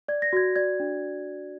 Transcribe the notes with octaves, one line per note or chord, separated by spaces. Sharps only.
D5 G#6
A#6
F#4 G#6
D5 G#6
D4